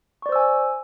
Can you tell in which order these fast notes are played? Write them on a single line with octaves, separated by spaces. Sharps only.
C#6 D5 C5 E6 G#5